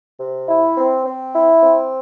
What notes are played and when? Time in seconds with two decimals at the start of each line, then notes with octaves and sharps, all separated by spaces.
0.19 C3
0.48 E4
0.77 C4
1.06 C4
1.35 E4
1.63 C4